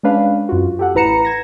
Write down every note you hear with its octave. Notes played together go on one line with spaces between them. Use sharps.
G#3 C#4 D4 B4 F5
F#2 F4 F#4
G4 A4 F#5
A1 E4 B4 A#5 C#7 E7
G#6 A#6